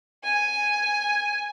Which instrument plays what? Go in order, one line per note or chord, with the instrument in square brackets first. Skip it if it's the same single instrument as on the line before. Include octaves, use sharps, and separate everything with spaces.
[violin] G#5